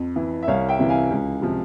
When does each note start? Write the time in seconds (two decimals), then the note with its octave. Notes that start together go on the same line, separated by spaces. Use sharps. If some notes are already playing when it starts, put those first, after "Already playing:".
Already playing: F2
0.16 E3
0.43 E5
0.47 C2 C#5 F5
0.69 E5 G5
0.79 C3 E3
0.89 F5 G#5
1.11 C#2
1.42 C3 F3